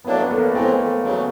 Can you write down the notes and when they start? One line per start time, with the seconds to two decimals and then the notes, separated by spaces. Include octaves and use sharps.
0.04 A2 F#3 A#3 B3 D4
0.21 B3
0.31 A3
0.38 A#3
0.54 A2 E3 G#3 A3 C4
1.04 E2 C#3 F#3